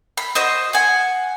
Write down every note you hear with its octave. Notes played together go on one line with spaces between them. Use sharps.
B5
F#4 C5 D#5
F#5 G#5